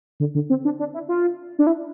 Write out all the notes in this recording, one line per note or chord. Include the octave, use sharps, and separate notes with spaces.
D3
D3
C4
D4
D4
E4
F4
D4
E4